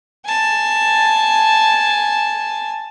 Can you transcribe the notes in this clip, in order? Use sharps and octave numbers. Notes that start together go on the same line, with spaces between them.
G#5 A5